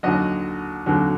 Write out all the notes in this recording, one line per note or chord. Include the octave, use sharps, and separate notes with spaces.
D#2 D3 F#3 D#5
D#2 D3 F#3